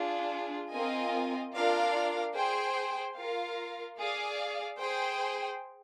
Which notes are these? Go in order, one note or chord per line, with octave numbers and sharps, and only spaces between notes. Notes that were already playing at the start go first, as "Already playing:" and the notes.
Already playing: D4 F4 G#4
C4 F4 A#4 D#5 G#5
D4 F4 A#4 D5 F5
G#4 C5 G5
F4 A#4 F5
G#4 D5 F5
G#4 C5 G5